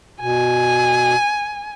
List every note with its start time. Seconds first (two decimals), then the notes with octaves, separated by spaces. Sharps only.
0.21 B2 G#5